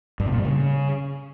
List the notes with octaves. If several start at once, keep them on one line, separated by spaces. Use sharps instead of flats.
G2
C3
A#2
G3
C#3